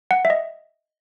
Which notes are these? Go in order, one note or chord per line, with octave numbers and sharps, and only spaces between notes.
F#5
E5
D#5